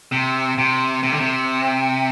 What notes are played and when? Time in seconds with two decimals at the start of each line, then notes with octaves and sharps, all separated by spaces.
0.12 C3
0.58 C3
1.03 C3
1.12 D3
1.20 C3